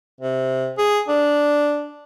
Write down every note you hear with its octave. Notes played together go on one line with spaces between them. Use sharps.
C3
G#4
D4